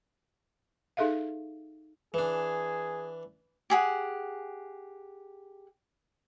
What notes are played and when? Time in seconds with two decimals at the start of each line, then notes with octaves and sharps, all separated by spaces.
0.97 D#4 G#4 A4 E5 F5
2.14 E3 D4 G#4
3.70 G4 G#4 F#5